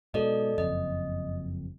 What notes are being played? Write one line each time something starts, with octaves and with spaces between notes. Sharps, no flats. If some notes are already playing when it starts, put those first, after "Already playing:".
G#2 B2 A4 D5 D#5
F#1 F2 D#5